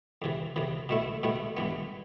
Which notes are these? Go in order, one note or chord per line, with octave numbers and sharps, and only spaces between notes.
E2 C3 E3
E2 C3 E3
B2 A3 E4
B2 A3 E4
G2 E3 B3